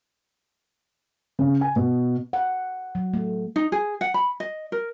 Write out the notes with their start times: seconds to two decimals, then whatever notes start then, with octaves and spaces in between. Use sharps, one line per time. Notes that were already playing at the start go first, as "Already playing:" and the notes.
1.39 C#3
1.61 G#5
1.76 B2
2.33 F#5
2.95 F#3
3.14 A3
3.56 D#4
3.72 G#4
4.01 F#5
4.14 B5
4.40 D#5
4.72 A#4